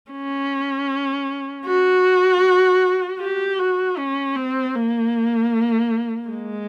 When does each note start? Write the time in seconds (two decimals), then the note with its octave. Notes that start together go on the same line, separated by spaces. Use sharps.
0.12 C#4
1.65 F#4
3.20 G4
3.59 F#4
3.98 C#4
4.36 C4
4.75 A#3
6.29 G#3